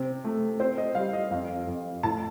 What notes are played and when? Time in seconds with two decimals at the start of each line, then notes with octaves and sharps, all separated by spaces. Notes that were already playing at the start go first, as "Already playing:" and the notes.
Already playing: C3 C4
0.24 A3
0.60 C4 C5
0.78 D#5
0.95 G3 F5
1.13 D#5
1.31 F2 F5
1.67 F2
2.03 A2 A5